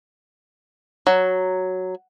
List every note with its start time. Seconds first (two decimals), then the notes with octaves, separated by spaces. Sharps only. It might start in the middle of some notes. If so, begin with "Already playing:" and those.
1.07 F#3